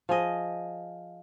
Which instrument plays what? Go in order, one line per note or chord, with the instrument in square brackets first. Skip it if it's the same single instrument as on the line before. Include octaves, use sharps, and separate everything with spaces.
[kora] F3 G#4 D#5